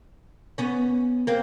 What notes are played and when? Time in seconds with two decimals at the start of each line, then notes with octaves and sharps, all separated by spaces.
0.58 B3 C#4
1.27 A#3 C4